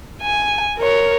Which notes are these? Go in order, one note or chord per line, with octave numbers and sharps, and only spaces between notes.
G#5
A#4 C#5